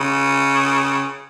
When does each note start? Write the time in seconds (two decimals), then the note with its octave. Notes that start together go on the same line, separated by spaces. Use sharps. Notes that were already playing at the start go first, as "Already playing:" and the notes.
Already playing: C#3